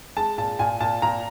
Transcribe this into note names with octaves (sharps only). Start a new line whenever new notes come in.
G#3 A5
A#2 A5
A#2 G#5
A#2 A5
A#2 A#5